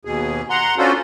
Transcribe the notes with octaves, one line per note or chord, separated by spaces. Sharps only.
D#2 B2 G#4
F#5 A#5 C6
C#4 D4 F4 F#4 A4 C5